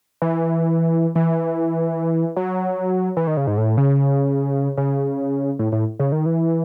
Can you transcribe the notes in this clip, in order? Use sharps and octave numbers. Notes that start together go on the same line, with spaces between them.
E3
E3
F#3
E3
D#3
C#3
G#2
A2
C#3
C#3
A2
A2
C#3
D#3
E3